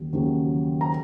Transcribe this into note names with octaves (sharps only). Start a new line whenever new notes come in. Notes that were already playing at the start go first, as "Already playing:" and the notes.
Already playing: D#2 C#3 F#3
D#2 C#3 F#3
A#5